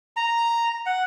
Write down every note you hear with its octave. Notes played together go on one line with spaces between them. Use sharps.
A#5
F#5